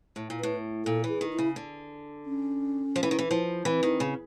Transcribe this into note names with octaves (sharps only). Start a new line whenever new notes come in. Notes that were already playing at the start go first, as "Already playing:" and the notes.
A2
A#2
A2 B4
A#2 A4
E3 G#4
D#3
E4
C#3
D3
C#4
F3
E3
D#3
E3
F3
E3 C4
D#3
C#3